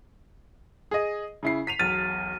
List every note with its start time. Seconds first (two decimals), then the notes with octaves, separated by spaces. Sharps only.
0.91 G#4 D#5
1.43 C#3 E4 C7
1.67 B6 D#7 F7
1.79 E1 B1 F6 A6 D#7